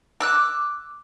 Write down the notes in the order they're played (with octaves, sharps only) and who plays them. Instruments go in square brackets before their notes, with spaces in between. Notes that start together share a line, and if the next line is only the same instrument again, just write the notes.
[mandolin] D6 E6 F#6